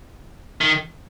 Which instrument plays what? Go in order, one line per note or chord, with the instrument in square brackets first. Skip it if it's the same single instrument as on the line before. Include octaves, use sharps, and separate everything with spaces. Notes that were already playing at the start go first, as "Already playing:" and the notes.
[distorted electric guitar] D#3